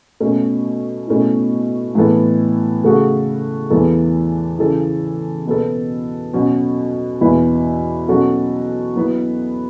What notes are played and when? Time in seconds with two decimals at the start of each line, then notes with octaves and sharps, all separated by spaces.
0.20 B2 A3 C#4
1.08 B2 A3 C#4 E4
1.95 A2 E3 B3 A4
2.83 C#3 A3 F#4 A4
3.70 E2 E3 B3 A4
4.59 C#3 E3 C#4 A4
5.46 B2 B3 A4
6.33 B2 F#3 C#4 F#4
7.20 E2 B2 B3 E4 B4
8.08 B2 F#3 C#4 F#4 A4
8.96 F#3 B3 E4 B4